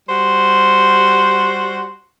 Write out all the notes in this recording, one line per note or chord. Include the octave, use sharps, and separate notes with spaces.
G3 F#4 C5